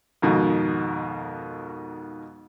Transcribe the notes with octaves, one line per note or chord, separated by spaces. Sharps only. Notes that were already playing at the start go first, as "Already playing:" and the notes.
F2 G#2 B2 D#3